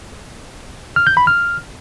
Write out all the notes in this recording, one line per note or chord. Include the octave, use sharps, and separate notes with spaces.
F6
G6
B5
F6